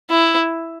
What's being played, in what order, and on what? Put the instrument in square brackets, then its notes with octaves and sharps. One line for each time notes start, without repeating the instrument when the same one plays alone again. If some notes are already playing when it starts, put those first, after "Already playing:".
[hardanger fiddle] E4